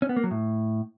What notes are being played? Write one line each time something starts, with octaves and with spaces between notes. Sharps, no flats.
C#4
B3
A#3
F#3
A2